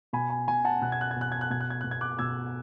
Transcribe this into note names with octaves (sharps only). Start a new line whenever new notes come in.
B2 G#5 B5
G#5
B2 G#5
F#5 A5
B2 F#6
G#6
F#6
G#6
B2 F#6
G#6
F#6
B2 G#6
F#6
G#6
B2 F#6
G#6
D6 F#6
B2 E6 G#6